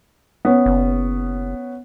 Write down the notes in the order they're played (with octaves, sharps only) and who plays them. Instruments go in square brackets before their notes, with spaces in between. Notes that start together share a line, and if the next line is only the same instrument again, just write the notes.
[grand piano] B3 C#4
[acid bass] F#1